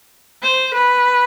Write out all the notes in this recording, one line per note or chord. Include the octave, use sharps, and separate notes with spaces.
C5
B4